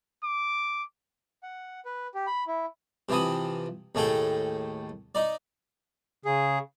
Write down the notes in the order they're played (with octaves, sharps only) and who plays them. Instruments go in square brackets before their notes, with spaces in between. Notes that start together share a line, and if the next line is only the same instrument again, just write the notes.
[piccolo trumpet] D6
[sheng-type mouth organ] F#5
B4
G4
B5
E4
[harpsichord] C3 E3 F3 E4 D#6
D#2 A2 A3 G#4 A4 G5
D#4 D5
[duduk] C#3 [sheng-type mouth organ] G#4